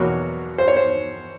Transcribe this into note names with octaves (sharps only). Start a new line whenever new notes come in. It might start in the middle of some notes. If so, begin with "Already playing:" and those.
Already playing: E2 B2 F#3 A#3 C#5
C5
C#5
C5